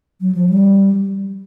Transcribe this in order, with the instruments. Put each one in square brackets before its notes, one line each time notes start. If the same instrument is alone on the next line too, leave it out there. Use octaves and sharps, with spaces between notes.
[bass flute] F#3
F3
G3